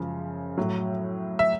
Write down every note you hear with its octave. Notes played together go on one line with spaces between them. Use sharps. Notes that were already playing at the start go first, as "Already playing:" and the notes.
Already playing: F#2 C#3 F3 G#3
A2 F#3
E5